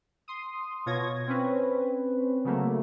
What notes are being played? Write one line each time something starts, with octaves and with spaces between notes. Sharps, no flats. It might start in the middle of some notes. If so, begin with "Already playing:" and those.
C6 D#6
B2 F4 C#5 G#6 A#6
C4 C#4 B4
C#3 F#3 A3 A#3